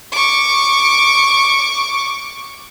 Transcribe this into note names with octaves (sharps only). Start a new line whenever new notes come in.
C#6 D6